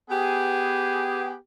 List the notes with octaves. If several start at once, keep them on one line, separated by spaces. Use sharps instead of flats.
B3 G4 G#4